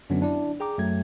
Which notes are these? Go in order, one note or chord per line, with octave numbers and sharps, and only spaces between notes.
F#2 D3 F#3 B3 C#4 D4
D4 E4 D5
G#4 G5 A#5 D6
F#2 F#3 A3 G#6